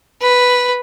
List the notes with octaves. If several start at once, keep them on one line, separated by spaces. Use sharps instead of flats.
B4